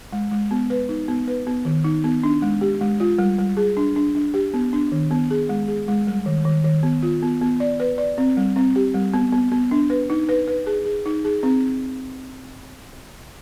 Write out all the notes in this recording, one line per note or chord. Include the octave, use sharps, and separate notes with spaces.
G#3
G#3
B3
B4
D#4
B3
B4
B3
D#3
D#4
B3
D4
G#3
G4
G#3
F4
G3
G3
G#4
D4
D4
D4
G4
B3
D4
D#3
B3
G#4
G#3
G#4
G#3
G3
D#3
D#3
D#3
B3
F4
B3
B3
D5
B4
D5
C4
G3
C4
G4
G3
B3
B3
B3
D4
B4
D#4
B4
B4
G#4
G#4
D#4
G#4
C4